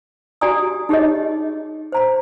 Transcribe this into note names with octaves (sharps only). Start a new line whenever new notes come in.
F#4 G4 D5 G#5 A#5 D#6
D#4 G4 G#4 C#5 D#5
C5 A#5 B5